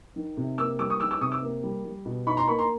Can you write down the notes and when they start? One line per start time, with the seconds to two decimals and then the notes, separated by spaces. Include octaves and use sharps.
0.16 D#3
0.37 C3
0.58 A#3 D6 E6
0.79 G3 D6 E6
0.90 C#6 D#6
1.00 D#3 D6 E6
1.11 D6 E6
1.21 C3 C#6 D#6
1.32 D6 E6
1.42 A#3
1.63 G3
1.85 G3
2.05 B2
2.26 D#4 B5 C#6
2.37 A#5 C6
2.48 A#3 B5 C#6
2.58 A#5 C6